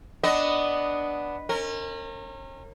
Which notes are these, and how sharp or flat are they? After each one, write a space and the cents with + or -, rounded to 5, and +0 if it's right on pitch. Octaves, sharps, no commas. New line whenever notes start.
B3 +0 D4 +0 D#5 +0
C#4 -40 A#4 -30